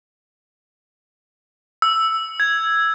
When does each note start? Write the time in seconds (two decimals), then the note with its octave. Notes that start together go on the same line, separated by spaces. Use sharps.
1.82 E6
2.40 G#6